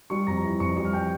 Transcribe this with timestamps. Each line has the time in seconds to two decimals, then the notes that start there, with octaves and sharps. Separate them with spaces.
0.10 G3 C#6 C#7
0.27 F2 A#5 A#6
0.43 E3
0.60 F2 C#6 C#7
0.77 G3 C#6 C#7
0.85 F6
0.93 G5 G6